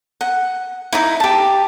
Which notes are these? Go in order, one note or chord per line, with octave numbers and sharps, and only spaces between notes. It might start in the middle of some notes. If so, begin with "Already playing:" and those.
F#5
D#4 E4
G4 A5